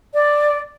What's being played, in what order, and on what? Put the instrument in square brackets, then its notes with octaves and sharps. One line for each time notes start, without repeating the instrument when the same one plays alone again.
[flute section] D5